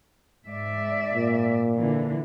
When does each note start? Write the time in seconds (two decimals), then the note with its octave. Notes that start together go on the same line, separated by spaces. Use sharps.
0.46 G#2 D5 E5
1.14 A#2
1.78 D3 E3